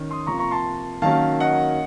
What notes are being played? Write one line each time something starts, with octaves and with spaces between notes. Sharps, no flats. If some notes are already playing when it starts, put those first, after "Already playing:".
Already playing: D#3 C#4
C6 D#6
C3 F3 A#3 F4 A#5 C#6
A#5 C#6
A5 C6
D#3 F#3 A#3 C#4 F5 A5
D#5 F#5